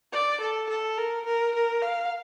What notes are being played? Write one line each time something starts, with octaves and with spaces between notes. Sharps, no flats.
D5
A4
A4
A#4
A#4
A#4
F5